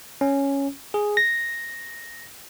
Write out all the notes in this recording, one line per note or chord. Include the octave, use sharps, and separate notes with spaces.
C#4
G#4
A#6